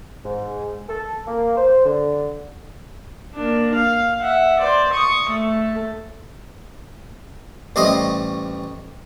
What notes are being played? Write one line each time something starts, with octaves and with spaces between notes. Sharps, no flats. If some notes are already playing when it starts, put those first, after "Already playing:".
G#2
A4
A#3
C5
D3
A#3 D4
F5
E5 F#5
C5 D5
C#6 D#6
A3 A4
A1 G3 A3 C5 D#5